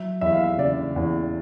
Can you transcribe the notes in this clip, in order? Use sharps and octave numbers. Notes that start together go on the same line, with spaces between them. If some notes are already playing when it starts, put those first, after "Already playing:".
Already playing: F#3 E5
E2 E5
F5
E5
C#3 D5
E2